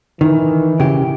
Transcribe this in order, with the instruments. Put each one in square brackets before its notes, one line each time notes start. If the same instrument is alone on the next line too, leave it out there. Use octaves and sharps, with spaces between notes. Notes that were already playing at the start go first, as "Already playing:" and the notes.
[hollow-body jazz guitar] D#3 [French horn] E3
[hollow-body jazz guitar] C#3 G4